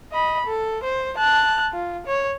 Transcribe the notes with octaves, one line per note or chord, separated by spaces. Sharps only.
D#5 B5
A4
C5
A5 F#6
F4
C#5